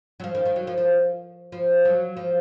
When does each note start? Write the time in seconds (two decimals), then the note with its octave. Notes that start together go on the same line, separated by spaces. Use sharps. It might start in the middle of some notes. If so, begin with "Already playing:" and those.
0.20 F#3
0.24 F3
0.35 D#3
0.46 D#3
0.56 F#3
0.67 F3
0.78 F3
1.52 F3
1.85 F#3
2.17 F3